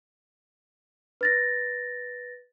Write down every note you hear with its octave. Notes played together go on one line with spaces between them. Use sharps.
B4 A6 A#6